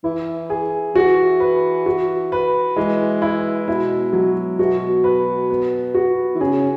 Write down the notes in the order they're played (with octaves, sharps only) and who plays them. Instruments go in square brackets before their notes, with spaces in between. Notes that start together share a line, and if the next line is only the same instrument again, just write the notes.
[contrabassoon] E3 [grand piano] E4
[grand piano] G#4
[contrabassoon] E3 [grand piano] F#4
[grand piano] B4
F#4
B4
[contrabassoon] E3 [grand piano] G#3
[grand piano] E4
[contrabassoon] B2 [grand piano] E4
[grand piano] F#3
[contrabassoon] B2 [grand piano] F#4
[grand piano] B4
B3
F#4
[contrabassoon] E3
[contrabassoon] C#3 [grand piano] G#4